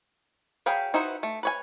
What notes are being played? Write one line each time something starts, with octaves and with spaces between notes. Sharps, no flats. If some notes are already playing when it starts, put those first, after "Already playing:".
F#3 G#4 F5 G5 B5
D#4 E4 F#4 B4 C5
A3
B4 C#5 G#5